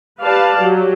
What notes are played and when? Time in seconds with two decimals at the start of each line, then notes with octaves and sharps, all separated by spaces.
0.20 G4 B4 D5 F5 A5
0.58 F#3 G4